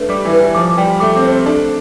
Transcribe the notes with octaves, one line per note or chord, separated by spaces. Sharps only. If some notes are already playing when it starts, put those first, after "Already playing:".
Already playing: A3 D4 B4
G3 D6
E3
B4
E3
F3 D6
G3 G5
A3 D6
C4
C5
C4
D4 A4